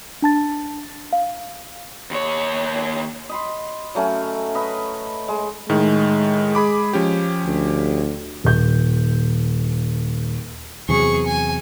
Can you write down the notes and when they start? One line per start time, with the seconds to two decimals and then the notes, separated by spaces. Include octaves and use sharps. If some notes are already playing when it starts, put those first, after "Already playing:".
0.22 D4 A5 A6
1.13 F5
2.11 D#2 C#5
3.29 D#5 B5 C6
3.95 F#3 A3 C#4
4.54 B4 D#5 B5
5.28 G#3
5.69 A2 D#3 G#3
6.55 G#4 B5 D6
6.93 F3 C#4 G4
7.45 D2
8.44 D#1 G6
10.89 E2 C3 F#3 G#4 C#6
11.26 G#5